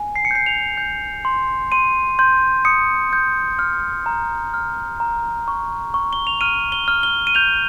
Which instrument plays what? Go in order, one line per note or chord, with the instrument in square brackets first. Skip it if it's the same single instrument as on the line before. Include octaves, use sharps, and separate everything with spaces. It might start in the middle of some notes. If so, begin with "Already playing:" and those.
Already playing: [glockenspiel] G#5
C7
C#7
G6 C7
F7
G6
C6
C6 D#7
C6 G6
D#6 C#7
G6
F6
A#5
F6
A#5
C#6
C#6
G7
F7
F6 D#7
G7
F6
G7
D#7
G6 F7